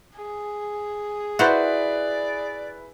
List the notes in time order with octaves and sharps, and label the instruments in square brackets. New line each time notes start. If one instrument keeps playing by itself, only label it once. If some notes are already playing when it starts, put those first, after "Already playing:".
[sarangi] G#4
[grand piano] E4 B4 [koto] F#4 C5 [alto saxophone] D5